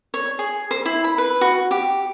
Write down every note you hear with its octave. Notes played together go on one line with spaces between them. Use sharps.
C#5
G#4
C5
E4
B5
B4
F#4
G4